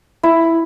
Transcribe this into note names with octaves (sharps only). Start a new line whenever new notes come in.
E4